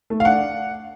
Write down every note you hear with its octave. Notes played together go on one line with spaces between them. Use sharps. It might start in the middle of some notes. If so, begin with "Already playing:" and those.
A3
F5
D4 F#5